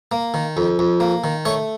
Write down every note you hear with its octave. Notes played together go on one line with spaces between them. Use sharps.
A#3
D#3
F2
F2
A#3
D#3
A3 C#5